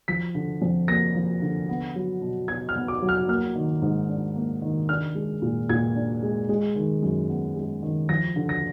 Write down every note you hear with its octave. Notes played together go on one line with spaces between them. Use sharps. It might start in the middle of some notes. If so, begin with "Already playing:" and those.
F3 B6
D3
F2
A#3 A#6
F3
D3
B3
F#3
B2
B2 G#6
F6
B3
D6
F#3
F6
A#3 F6
D#3
G#2
D4
A#3
D#3
D4 F6
G#3
A#2
A#2 G#6
D4
G#3
G#3
D#3
F#2
B3
G#3
D#3
F3 A#6
D3
A#6